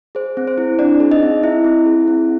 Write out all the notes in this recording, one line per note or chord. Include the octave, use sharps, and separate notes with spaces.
G#4 C5
C4
C5
E4
C4 D4 D5
G#4
D#4 D#5
C4
E4 E5
C4
G#4
C4